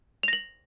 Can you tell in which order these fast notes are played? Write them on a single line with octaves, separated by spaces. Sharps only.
F7 A#6 F#7